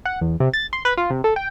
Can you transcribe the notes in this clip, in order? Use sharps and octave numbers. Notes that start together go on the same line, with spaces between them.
F#5
E2
C3
A6
C6
B4
F4
C3
A4
G5